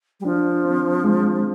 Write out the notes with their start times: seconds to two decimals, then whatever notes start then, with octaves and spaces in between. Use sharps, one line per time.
0.20 G3
0.25 F3 D4
0.65 C4
1.04 G#3